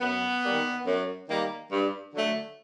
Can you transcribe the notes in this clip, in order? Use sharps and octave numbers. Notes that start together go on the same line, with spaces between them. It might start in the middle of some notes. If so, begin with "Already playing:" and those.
F#2 B3
D#3 G3 A#3
F#2
D#3 G3 A#3
G2
D3 F#3 A3